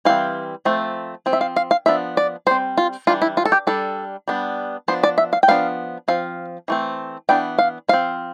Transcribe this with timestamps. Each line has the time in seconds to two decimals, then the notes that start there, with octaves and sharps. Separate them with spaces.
0.05 E3 G3 C4 F5
0.65 F3 A3 C4
1.26 F3 C4
1.33 E5
1.41 F5
1.56 F5
1.71 F5
1.86 F3 B3 D4 E5
2.17 D5
2.47 G3 C5
2.51 C4
2.77 F4
3.07 E3 G3 D4 F4
3.22 E4
3.37 F4
3.45 A4
3.52 G4
3.67 G3 D4 A4
4.28 G3 B3 D4
4.88 F3 B3 D4 C5
5.03 D5
5.18 E5
5.33 F5
5.43 G5
5.48 F3 B3 D4 F5
6.08 F3 C4 F5
6.68 E3 A3 C4
7.29 E3 B3 D4 G5
7.59 F5
7.89 F3 C4 F5